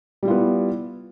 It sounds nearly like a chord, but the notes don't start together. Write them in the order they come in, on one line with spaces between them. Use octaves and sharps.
G3 E4 F4 B3